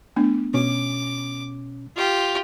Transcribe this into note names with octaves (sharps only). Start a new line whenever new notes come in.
A3 B3 D4
B2 C#4 D6
F4 G4